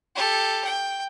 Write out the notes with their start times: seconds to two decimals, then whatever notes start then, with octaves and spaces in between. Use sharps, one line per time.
0.16 G4 A4
0.65 G5